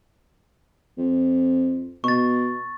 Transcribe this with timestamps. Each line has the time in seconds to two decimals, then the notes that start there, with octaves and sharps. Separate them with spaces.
0.98 F2
2.04 B2 C#6 A6